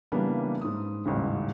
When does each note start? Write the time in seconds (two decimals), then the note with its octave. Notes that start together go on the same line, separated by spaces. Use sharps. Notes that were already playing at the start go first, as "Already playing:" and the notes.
0.12 C#3 E3 G3 A#3 B3 D4
0.61 G#2 D#6
1.05 D#1 A1 G#2 C#3